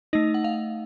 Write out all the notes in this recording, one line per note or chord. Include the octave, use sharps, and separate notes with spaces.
A3 D#4 D#5
F#5
F5